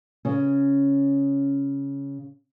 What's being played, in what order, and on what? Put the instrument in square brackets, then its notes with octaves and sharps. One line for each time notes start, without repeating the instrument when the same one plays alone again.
[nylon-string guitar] C#3 C#4